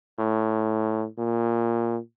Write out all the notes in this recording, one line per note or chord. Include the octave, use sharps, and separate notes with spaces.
A2
A#2